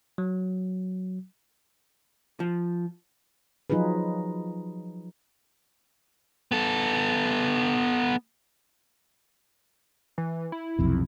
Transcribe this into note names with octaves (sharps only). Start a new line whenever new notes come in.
F#3
F3
F3 F#3 D#4 F4 G#4 B4
B3 A4
E3
E4
B1 F2 C3